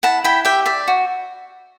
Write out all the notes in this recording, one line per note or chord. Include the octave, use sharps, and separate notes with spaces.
E4 F#5 A5
E4 G5 B5
G4 E5 G5
D5 E5
F#4